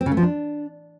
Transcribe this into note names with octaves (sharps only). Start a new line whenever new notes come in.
C4
C#3
A3
F3
D4